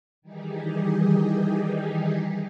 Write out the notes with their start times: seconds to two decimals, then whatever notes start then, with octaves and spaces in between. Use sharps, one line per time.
0.22 D#3 E3 G3 D#4 G4 G#4